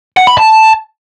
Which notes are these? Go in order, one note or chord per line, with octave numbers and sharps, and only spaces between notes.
F#5
B5
A5